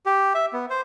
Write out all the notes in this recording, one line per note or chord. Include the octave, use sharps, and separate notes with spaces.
G4
E5
B3
C5